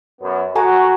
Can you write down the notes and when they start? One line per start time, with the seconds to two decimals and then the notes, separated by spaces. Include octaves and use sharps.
0.21 F#2 B3
0.56 F#4 A4 G#5 A#5